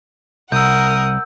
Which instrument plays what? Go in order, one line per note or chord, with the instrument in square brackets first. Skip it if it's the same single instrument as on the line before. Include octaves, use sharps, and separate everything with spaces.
[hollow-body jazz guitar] C2 [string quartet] A#4 F#5 D#6 [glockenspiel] E6 G6